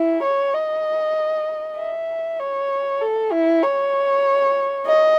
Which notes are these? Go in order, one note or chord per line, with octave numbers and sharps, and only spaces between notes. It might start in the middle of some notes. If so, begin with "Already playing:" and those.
Already playing: E4
C#5
D#5
E5
C#5
A4
E4
C#5
D#5